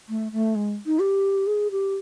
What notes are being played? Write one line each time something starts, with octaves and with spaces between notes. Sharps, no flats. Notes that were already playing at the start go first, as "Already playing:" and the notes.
A3
A3
G#3
D#4
G4
G#4
G4